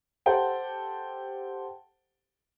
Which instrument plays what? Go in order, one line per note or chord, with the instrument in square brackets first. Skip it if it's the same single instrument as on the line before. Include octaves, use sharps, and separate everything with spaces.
[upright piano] G4 A4 C5 F#5 G5 A5